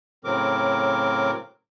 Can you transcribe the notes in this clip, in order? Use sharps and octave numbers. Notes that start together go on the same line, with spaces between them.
A2 C#3 F#3 C4 A#4 D6